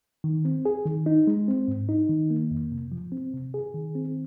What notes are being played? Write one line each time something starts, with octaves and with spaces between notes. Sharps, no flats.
D#3
C4
G#4
D#3
D#4
G#3
C4
G#2
D#4
D#3
A#3
F2
C3
F3
C4
C3
G#4
D#3
C4